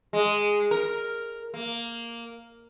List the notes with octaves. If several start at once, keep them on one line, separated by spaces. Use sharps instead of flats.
G#3
A#4
A#3